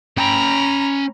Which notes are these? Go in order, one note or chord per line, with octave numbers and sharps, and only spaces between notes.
C#4 G5 A#5 B5